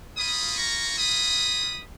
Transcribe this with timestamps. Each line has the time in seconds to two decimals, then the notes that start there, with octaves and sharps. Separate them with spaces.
0.17 A#3 F4 B5 D#6
0.57 A#5 C#6
0.98 B5 D#6